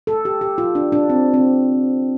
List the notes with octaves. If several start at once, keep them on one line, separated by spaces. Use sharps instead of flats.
A4
G4
G4
F4
D4
D4
C4
C4